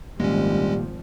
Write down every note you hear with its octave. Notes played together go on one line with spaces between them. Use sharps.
D#1 G#1 D#2 F3 G3 G#3 A#3 C#4